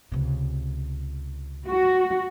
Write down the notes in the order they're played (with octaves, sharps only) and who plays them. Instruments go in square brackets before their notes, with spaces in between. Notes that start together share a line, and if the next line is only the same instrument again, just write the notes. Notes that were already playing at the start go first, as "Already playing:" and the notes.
[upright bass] C#2 C3
[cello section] F#4